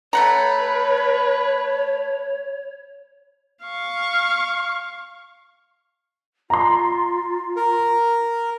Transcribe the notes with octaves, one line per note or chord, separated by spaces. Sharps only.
A3 B4 C#5 F#5 A#5
F5 C#6
F4 A#5 C6
A#4